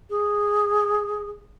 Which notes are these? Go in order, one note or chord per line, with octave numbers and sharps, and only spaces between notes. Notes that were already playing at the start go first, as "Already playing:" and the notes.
G#4